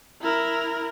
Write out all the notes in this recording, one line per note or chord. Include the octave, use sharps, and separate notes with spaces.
E4 A#4